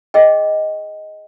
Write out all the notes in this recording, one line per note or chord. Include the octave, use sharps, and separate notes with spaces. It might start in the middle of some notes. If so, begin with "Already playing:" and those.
G#4 D#5 G5